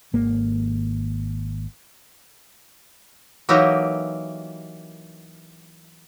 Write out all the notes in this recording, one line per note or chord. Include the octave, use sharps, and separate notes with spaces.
G#1 A#3
E3 F#3 A#3 D#4 F#4 G4